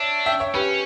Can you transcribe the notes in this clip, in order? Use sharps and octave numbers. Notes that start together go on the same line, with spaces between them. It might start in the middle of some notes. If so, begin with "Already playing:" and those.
Already playing: D4 C#5 E5
E5 G5
C#5 E5
C#4 G4 B4